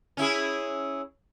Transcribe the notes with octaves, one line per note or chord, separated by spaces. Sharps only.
C#4 E4 G#4